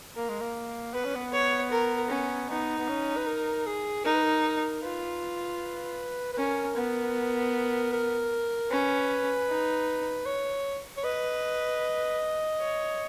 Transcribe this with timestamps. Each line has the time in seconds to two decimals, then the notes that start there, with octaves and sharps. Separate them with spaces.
0.16 A#3 A#4
0.29 G#3
0.41 A#3
0.94 B3 B4
1.05 C#4
1.15 B3
1.33 C#5
1.71 A#4
2.10 C#4
2.50 B3 D#4
2.78 B3
2.89 C#4
3.17 B4
3.27 A#4
3.66 G#4
4.05 D#4 A#4
4.14 B4
4.23 A#4
4.83 F4 B4
6.33 B4
6.38 C#4 A#4
6.77 B3
7.93 A#4
8.71 C#4 B4
9.49 D#4
10.26 C#5
10.97 C#5
11.04 B4 D#5
12.59 C#5